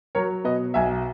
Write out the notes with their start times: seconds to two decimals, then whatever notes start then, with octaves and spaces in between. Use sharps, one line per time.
0.15 F#3 A#4 C#5
0.44 B2 B4 D#5
0.74 B1 E5 G#5